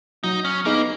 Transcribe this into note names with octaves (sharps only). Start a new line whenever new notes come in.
F#3 D#4
C#4
A#3 B3 D#4 G#4